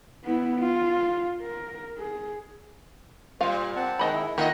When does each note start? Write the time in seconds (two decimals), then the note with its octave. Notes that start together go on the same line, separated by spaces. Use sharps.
0.24 B3 E4
0.59 F4
1.41 A#4
1.98 G#4
3.41 A#2 G3 F4 C5 F5
3.76 C4 F#5 A5
3.99 D#3 G#3 D#5 B5
4.13 E4
4.38 D#3 A3 F4 D#5 F#5